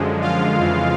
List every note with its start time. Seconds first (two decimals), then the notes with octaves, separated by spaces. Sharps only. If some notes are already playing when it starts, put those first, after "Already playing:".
Already playing: F#2 D3 F3 G#3
0.21 F4 F5
0.57 F2 C#3 E3 G#3